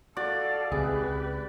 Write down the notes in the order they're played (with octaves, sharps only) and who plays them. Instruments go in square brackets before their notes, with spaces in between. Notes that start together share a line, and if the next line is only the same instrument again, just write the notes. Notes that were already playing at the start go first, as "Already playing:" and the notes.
[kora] F#4 [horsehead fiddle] A4 F5 [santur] D5
[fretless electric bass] C#2 C4 [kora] E4 G#4 [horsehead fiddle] G4 B4